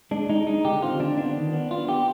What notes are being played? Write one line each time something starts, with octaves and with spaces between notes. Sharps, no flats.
G#3 D4
G#3 D#4
G#3 D#4
D3 G4
C4 F4
D3 D4
B3 D4
D#3
B3
B3 F4
B3 G4